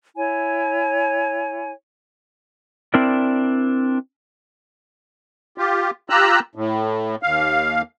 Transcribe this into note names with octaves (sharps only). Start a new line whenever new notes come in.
E4 C#5 G#5
C4 D4 E4 A#4 D5
F4 G4
F4 G4 A#5 E6 F#6
A2
D#2 F5